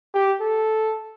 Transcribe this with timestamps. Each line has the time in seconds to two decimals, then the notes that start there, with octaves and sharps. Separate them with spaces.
0.14 G4
0.41 A4